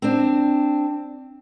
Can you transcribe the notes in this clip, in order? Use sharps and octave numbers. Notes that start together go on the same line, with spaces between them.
C4 D4